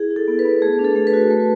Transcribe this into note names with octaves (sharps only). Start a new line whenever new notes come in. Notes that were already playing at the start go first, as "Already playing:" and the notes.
Already playing: E4 G#4
E4
A4
B3
B4
B3
A3 G#4
D4
A4
A3
B4
F#4
A3